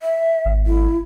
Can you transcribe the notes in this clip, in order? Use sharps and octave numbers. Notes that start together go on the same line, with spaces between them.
E5
G#1
E4